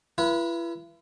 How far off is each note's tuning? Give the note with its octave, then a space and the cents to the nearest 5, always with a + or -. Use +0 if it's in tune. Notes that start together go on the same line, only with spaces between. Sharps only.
E4 +40 B4 -25